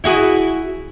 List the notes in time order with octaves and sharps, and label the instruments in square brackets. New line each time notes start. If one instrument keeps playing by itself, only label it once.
[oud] E4 F#4 G#4